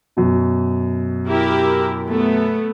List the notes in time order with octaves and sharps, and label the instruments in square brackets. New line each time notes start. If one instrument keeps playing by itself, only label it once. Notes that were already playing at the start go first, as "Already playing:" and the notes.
[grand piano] F#2 B2
[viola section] E4 G4 A#4
A3 B3